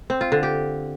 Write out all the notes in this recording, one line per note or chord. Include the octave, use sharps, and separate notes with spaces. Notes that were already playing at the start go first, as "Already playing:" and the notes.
C4
F4
D3
G4